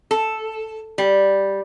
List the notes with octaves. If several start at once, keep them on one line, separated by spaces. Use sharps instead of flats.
A4
G3